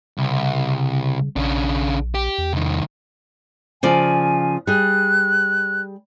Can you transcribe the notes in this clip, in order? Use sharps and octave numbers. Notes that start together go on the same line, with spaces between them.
C2 C#3
A#1 C#3 D4
G4
E2
C2 D#3
C#3 F3 D5 G#5
G3 G#4 F#6